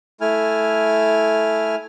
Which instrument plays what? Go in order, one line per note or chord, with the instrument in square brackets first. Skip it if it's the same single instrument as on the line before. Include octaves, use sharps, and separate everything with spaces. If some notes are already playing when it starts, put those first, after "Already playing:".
[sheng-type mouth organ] A3 E4 G#5 F6